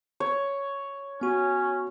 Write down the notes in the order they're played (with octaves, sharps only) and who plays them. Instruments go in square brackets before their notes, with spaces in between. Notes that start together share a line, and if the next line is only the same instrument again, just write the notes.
[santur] C#5
[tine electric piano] B3 F#4 [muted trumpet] C#4